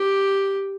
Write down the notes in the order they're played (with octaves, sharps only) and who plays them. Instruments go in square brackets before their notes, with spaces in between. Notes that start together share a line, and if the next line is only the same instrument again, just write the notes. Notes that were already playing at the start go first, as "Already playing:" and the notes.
Already playing: [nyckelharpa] G4